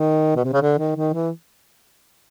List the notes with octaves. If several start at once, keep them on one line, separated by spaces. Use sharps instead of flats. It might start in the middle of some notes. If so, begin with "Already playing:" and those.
Already playing: D#3
B2
C3
C#3
D3
D#3
D#3
E3